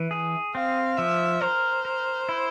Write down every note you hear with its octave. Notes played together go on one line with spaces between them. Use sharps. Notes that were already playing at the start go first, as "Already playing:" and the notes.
Already playing: E3
G#4
C4 F5
F3 E5
A#4 C5
A#4
E4